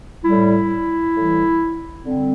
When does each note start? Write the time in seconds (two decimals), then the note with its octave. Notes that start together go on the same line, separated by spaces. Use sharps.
0.25 A2 G3 E4
1.15 A2 E3 G3
2.05 D3 G3 C4